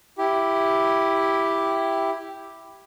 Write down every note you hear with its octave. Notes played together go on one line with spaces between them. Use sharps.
E4 G4